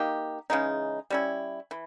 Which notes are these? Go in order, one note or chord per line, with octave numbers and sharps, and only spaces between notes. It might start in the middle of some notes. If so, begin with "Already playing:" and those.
Already playing: A#3 D#4 G4
C#3 E3 G#3 D#4
G3 C#4 E4
E3